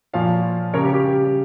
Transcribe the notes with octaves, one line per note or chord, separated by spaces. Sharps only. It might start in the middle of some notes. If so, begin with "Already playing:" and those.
A#2 F3 C#5 F5
C#3 G3 A#4 C#5
G4
G4